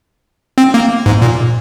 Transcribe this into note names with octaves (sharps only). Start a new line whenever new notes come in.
C4
A#3
G#2
A#2